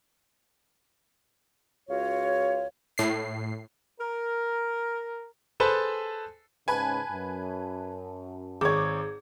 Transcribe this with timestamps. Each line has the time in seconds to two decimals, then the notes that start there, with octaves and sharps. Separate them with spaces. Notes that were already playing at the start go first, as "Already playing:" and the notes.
1.90 C#2 F4 F#4 C#5
2.98 A2 C7
4.00 A#4
5.60 G#4 A4 B4 C5 G#5 A5
6.68 G#2 C#3 B4 G#5 A5
7.11 F#2
8.61 G#1 G#4 C#5 D6 G#6